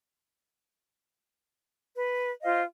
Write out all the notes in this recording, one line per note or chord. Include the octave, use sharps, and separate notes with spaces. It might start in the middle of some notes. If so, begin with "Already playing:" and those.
B4
F4 C5 D#5 F5